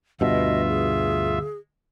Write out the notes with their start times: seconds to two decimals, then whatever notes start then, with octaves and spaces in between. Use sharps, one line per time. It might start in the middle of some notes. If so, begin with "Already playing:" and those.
0.21 D2 G2 B2 F4 D#5 E5
0.69 G#4